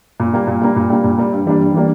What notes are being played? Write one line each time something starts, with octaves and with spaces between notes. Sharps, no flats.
A#2
G3 A#3
A#2
G3 A#3
A#2
G3 A#3
A#2
G3 A#3
G2
E3 G3 A#3 D4
G2
E3 G3 A#3 D4